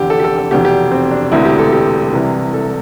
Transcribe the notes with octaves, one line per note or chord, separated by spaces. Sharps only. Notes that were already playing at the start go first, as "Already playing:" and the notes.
Already playing: F1 E2 D3 G4
A4
G4
A4
A4
F1 E2 B2 G4
G4
C4
D4
E1 D2 C3 E3 E4
G4
A4
G4
C2 C3 E3
A4